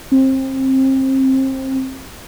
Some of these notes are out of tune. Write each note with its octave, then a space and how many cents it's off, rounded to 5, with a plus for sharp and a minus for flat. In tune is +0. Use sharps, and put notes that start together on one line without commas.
C4 +25